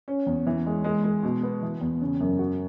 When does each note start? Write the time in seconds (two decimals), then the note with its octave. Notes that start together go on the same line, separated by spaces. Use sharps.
0.08 C#4
0.27 E2
0.47 E3
0.66 G#3
0.84 G#3
1.04 G#3
1.23 B2
1.43 B3
1.62 E3
1.81 E2
2.01 C#3
2.20 F#2
2.39 F#4